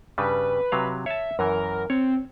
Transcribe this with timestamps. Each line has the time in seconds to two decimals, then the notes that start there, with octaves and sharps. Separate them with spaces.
0.18 G2 C#3 G3 B4
0.72 C3 F#3 F5
1.06 C#5 E5 A5
1.39 F#2 E3 A#4
1.90 C4 C#5